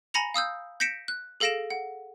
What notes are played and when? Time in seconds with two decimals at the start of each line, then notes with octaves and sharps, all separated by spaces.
0.14 G#5 A#5 B5 A#6 C#7 F7
0.34 F5 D#6 E6 G6
0.80 G6 A#6 B6 C#7 D7 E7
1.08 F#6
1.40 G#4 A4 F5 A#6 D7 E7
1.70 F#5